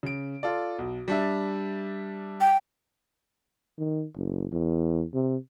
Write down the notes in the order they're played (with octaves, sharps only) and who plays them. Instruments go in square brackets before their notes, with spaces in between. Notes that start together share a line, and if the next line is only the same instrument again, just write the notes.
[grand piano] C#3 D7
F4 A4 D5
B1
G3 D4 E5
[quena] G5
[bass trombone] D#3
F#1
E2
C3